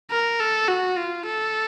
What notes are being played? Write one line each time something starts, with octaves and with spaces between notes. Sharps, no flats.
A#4
A4
F#4
F4
A4